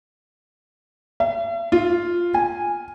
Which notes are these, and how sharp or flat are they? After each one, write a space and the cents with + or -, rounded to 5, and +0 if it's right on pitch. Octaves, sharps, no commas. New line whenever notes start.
E5 +45
F4 +0
G#5 -10